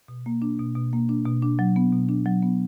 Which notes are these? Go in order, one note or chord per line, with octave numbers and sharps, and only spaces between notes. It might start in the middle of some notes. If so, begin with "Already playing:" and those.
B2
A#3
D4
B2
B2
A#3
D4
B2
D4
F#3
B3
B2
D4
F#3
B3